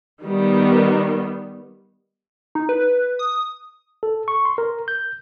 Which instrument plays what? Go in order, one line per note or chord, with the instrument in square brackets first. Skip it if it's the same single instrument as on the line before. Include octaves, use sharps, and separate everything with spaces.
[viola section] D#3 G3 B3
[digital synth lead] D#4
B4
D#6
[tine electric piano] A4
C#6
C6
A#4
G6